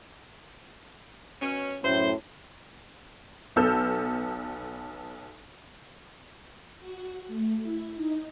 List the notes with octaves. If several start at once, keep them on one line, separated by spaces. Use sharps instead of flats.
B2 C#4
F#2 A2 C5
B1 B3 A4 E6 F6 G6
F#4
A3
E4
D#4